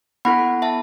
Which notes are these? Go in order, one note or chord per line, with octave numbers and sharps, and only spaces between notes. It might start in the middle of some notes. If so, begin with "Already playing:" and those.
B3 E4 A4 F#5 B5
E5 A5